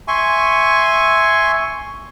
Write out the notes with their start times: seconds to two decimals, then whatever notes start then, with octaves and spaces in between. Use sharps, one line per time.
0.08 E5 G#5 C6 C#6